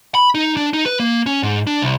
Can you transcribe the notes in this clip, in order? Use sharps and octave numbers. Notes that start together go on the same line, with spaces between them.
B5
D#4
D4
D#4
B4
A#3
C#4
G#2
D4
C2